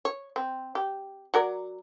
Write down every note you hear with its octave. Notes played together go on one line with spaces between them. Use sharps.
C#5
C4
G4
F#3 A#4 D5